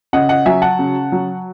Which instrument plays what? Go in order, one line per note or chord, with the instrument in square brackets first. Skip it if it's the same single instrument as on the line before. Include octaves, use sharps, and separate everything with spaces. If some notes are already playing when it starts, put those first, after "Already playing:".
[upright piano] C#3 D#5 F#5
D#5 F#5
F#3 E5 G#5
F#5 A5
C#3
F#3